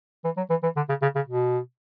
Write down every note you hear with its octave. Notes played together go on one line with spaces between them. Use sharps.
E3
F#3
E3
E3
D3
C#3
C#3
C#3
B2